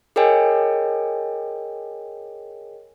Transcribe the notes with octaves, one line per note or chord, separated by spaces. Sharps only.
G#4 A#4 C#5 D#5 G5 G#5